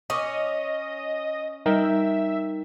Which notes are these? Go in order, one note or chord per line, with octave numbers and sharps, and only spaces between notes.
C#4 D#5 D6 D#6
G3 D#4 A#4 E5 G5